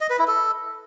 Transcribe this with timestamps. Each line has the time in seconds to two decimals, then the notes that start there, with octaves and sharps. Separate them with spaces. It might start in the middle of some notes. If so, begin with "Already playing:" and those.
0.01 D#5
0.10 B4
0.19 E4
0.28 A4